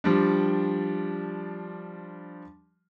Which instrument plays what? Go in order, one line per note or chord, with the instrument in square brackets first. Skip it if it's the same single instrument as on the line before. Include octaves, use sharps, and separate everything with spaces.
[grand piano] F3 G3 D4